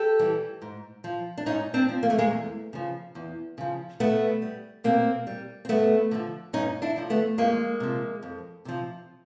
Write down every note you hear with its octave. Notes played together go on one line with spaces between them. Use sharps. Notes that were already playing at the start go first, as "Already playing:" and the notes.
Already playing: G4 A4
E3 G3
G#2
F3
D4
G#2 C#4 D#4
C4 D4
F3
A#3
A3
G#3 A#3
E2
C#3 F3
E2
C#3 F3
B2 A3 B3
G3
B2 A#3 C4
G3
C4
G2 A3 B3
D3 F3
G2 C#4 D#4
D4 E4
D3 F3
A3 B3
F2 G#3 A#3
C3 F3
F2
C3 F3